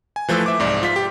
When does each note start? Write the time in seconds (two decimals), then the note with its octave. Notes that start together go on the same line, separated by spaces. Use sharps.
0.16 G#5
0.28 E3 F3 A3 B4 E6
0.46 E5 D6
0.60 C2 G#2 D5
0.83 F4 B6
0.96 G4